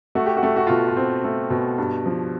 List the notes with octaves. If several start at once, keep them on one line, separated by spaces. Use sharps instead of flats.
A3 F#4
G4
F#4
A3
F#4
B2 F4
F4
C4
A3
B2
G2
F3